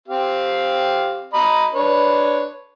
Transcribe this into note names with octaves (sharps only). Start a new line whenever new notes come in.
C4 G4 F5
D#5 A#5 B5
D4 B4 C#5